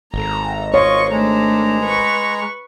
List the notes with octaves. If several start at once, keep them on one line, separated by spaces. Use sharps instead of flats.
G#1 A4 A#5
F4 C#5 D#5 C#6
G#3 A3 D4 A#5
B4 C#6